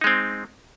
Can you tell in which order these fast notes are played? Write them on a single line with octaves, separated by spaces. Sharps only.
D#4 G#3 C4